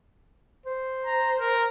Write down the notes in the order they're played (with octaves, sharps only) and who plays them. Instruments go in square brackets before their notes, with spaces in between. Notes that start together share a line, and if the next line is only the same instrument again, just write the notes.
[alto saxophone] C5
[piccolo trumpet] A#5
A#4